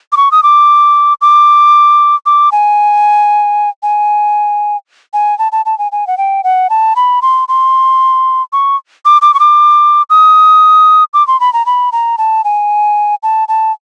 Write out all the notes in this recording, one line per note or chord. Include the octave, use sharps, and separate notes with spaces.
D6
C#6
D#6
D6
D6
D6
G#5
G#5
G#5
A5
A5
A5
G#5
G#5
F#5
G5
F#5
A5
B5
C6
C6
C#6
D6
D6
C#6
D6
D#6
D6
C6
B5
A#5
B5
A#5
A5
G#5
A5
A5